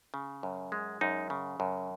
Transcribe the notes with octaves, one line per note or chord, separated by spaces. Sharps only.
C#3
F#2
G#3
F#2 D#4
C#3
F#2